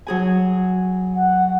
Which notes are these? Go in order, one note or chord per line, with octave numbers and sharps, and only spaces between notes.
F#3 G#4 G#5
F#5